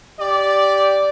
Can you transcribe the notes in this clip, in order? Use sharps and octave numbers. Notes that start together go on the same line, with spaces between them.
G4 D5